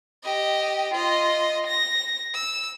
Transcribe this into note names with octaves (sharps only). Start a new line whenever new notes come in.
G4 D#5
F4 D#5
A#6
E6